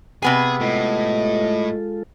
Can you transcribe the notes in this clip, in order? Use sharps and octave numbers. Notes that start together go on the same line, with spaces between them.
C3 B3 G#4 G#5
A2 G#3 F4 A4 D#5